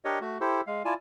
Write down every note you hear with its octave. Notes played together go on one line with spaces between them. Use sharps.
D4 G4 A#4 C#5 D#5
A3 F#4
E4 G4 A4 C5
G#3 F5
E4 F4 D5 G#5 A5